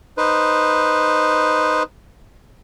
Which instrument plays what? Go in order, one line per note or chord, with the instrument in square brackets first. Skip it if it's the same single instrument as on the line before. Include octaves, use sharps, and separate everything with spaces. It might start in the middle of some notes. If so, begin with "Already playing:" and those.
[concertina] D#4 B4 C5